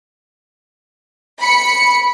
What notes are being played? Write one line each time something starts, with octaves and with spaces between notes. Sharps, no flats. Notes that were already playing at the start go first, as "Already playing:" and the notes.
B5 C#7